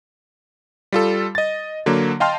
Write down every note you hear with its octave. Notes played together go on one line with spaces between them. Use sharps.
G3 F4 A4
D#5 A6
D3 F#3 A#3
D#5 F5 G5 A5 C6 F6